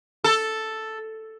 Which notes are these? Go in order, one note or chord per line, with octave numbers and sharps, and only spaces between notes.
A4